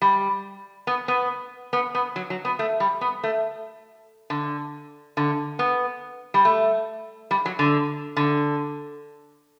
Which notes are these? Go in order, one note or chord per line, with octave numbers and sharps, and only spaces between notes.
G3
B3
B3
B3
B3
F#3
F#3
B3
A3
G3
B3
A3
D3
D3
B3
G3
A3
G3
F#3
D3
D3